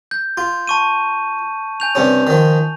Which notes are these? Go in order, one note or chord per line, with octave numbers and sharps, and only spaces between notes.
G6
F4
A5 C#6 D#7
G#5 G6 F7
G2 C3 C#4
D#3 F3